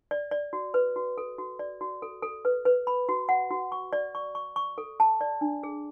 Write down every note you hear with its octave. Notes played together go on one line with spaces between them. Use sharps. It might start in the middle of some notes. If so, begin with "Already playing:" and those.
D5
D5
F#4
B4
F#4
A4
F#4
D5
F#4
A4
A4
B4
B4
B5
F#4
F#5
F#4
C#6
D5
C#6
C#6
C#6
A4
A5
D5
D4
G#4